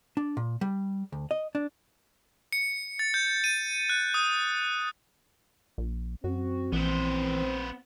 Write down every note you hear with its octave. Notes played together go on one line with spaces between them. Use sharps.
D4
A#2
G3
D2
D#5
D4
C#7
A6
G6
D#7
F#6
D#6
A#1
F#2 C4 F#4
A#1 E3 B3 C5